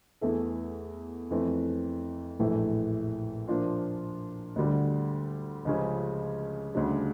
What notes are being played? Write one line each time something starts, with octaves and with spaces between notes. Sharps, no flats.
E2 E3 A3 E4 A4
F2 E3 A3
A#1 A2 E3 A3 E4
A#2 F3 A#3 D4 F4
D2 D3 G3
C#2 C#3 F3 C#4 G4
D2 C#3 G3 D4